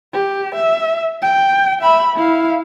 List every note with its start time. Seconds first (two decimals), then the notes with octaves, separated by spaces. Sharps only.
0.13 G4
0.55 E5
1.22 G5
1.82 E5 B5
2.16 E4 F5